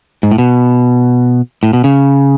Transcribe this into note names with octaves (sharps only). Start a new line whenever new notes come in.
G#2
A2
B2
A2
B2
C#3